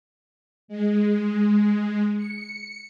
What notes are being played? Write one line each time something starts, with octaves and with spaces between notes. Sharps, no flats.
G#3
C#7